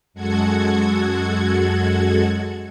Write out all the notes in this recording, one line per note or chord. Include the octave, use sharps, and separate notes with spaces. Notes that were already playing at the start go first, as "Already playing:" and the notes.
F#2 G#3 F#4 A4 F#5 G#6